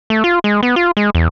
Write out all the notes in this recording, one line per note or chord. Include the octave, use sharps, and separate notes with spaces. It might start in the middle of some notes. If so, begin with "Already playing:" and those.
A3
F4
G#3
B3
F4
G#3
E2